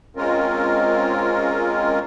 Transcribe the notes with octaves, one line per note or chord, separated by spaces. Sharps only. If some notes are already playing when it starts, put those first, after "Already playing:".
G#3 C4 C#4 F4 A#4